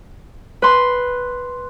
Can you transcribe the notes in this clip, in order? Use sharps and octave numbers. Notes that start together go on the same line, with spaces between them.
B4 C6